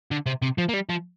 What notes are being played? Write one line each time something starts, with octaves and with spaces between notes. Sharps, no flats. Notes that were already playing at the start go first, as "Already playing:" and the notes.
D3
C3
C3
F3
A#3
G3
F3